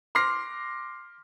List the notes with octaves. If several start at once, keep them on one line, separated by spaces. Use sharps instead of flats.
C6 D6 F6 A#6 C7